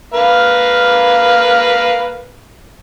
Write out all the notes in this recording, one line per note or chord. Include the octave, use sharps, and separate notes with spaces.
A#3 B4 F5